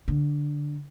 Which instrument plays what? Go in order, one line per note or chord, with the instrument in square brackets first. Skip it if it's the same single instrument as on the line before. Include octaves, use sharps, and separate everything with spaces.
[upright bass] D3